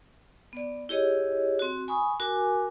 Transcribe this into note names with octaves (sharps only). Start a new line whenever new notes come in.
B3 D5
E4 G4 G#4 C#5 D#5
C4 F#4
G#5 B5 C#6 D#6
F#4 A#4 G#5 D6